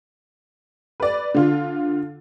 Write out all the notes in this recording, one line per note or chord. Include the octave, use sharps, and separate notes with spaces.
B4 D5
D3 F4